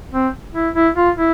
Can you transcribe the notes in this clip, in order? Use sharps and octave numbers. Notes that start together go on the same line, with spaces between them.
C4
E4
E4
F4
E4